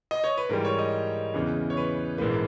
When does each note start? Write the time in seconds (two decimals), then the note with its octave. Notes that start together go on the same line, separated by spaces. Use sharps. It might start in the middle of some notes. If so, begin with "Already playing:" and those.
0.11 D#5
0.24 C#5
0.37 B4
0.49 G#2 E3 G3 A#4
0.65 C#5
0.79 D#5
1.34 E2 C#3 E3
1.70 C#5
1.77 B4
2.18 A#1 G#2 E3 A#3 B4